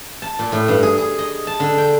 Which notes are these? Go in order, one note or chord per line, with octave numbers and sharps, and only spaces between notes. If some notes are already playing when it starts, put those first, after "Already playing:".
A5
A#2
A2
G2
G#4
G#4
D#5
A5
D3
G5